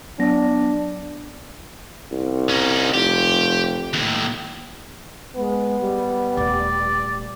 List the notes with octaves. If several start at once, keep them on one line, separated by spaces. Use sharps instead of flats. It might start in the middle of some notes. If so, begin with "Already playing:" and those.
F#3 B3 D4 A#6
C2
C#4 D#4
F1 G4
D#2 A2
G#3 B3
G3
D#1 A3 D5